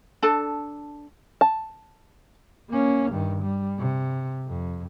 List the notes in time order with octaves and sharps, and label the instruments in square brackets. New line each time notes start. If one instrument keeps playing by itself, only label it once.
[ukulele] D4 A4
[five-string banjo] A5
[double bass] A#3 C#4
G2 D#3
G3
C3
F2